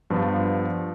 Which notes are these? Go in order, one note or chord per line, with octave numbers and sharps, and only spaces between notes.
G2 F3 B3 F4